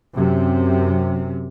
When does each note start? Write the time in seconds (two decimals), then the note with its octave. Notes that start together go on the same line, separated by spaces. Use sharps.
0.14 F#2 C3